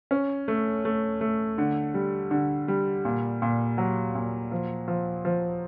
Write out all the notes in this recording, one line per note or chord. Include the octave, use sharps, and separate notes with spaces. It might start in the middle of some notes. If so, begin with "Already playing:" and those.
C#4
A3
A3
A3
D3
G3
D3
G3
A#2
A#2
F#3
A#2
F3
F3
F3